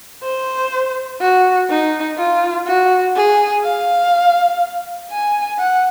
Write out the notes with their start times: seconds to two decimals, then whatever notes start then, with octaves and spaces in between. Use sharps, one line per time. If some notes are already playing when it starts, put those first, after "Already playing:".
0.23 C5
1.21 F#4
1.70 D#4
2.18 F4
2.67 F#4
3.16 G#4
3.64 F5
5.11 G#5
5.59 F#5